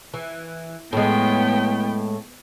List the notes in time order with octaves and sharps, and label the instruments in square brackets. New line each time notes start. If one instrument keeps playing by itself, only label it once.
[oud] E3
[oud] A2 G#3 [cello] B3 G5